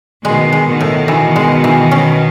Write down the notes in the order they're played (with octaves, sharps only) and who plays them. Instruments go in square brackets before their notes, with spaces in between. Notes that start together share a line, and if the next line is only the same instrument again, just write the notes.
[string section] B2 D#3 [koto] G#3
[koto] G#3
[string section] B2 D#3
[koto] A2
E3
G#3
E3
C#4